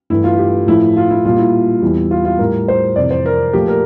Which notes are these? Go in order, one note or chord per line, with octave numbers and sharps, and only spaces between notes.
G2 E3 A3 E4
F4
G4
A2 F3 A3 E4
F4
E4
A#2 G3 F4
E4
E2 E3 G3
F4
F4
A2 G3 A#4
C5
F2 C3 E3 D5
C5
A#4
A#2 F3 A3 G4
A#4